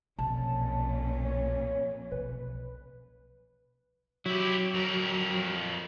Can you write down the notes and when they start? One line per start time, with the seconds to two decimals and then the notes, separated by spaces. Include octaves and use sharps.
0.19 B1 F2 A#2 C#4 A5
1.25 C#5
2.12 B1 B4
4.26 F#3 E4 G4
4.74 F2 A#4